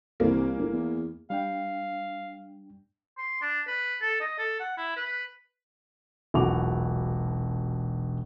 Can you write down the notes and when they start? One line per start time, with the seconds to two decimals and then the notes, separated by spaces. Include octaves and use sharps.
0.20 C2 E3 A#3
0.58 G1
0.72 E2
1.30 G3 D4 F5 G5
3.18 C6
3.42 D4
3.67 B4
4.01 A4
4.20 D#5
4.38 A4
4.60 F#5
4.77 E4
4.96 B4
6.34 E1 B1 A#2 F#4 D6 F7